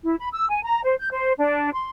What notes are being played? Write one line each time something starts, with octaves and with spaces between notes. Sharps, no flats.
E4
B5
E6
G#5
A#5
C5
G6
C5
D4
C6